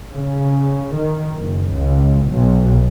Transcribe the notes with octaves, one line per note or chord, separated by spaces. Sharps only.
C#3
D#3
F#1
C#2
B1